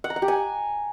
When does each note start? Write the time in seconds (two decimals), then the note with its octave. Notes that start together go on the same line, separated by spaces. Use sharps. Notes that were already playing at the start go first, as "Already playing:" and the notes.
0.04 F#5
0.10 A#5
0.16 F#5
0.22 G4
0.28 G#5